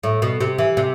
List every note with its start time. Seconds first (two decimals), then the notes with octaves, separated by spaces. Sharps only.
0.03 A2
0.22 B2
0.40 C3
0.58 E3
0.77 C3